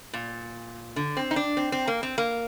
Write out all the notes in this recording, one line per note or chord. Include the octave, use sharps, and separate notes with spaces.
A#2
D3
C4
D#4
D4
C4
C4
A#3
C4
A#3